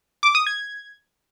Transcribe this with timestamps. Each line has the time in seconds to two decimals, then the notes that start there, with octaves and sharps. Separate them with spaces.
0.23 D6
0.35 D#6
0.47 G#6